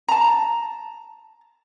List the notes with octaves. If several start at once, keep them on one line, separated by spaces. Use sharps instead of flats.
A5 A#5